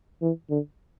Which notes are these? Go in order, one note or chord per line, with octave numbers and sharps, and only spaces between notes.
E3
D3